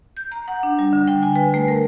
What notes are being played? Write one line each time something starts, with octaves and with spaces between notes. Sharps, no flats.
G6
A#5
F#5
D4
G3
D3
G5
G#5
B4
A3
A#4